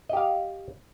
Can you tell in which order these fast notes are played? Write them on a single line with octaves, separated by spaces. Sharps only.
D#5 G4 F5